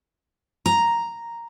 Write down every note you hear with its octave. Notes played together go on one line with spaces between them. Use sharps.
A#5